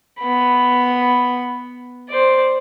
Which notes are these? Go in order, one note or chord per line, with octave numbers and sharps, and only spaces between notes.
B3 B5
C5 D5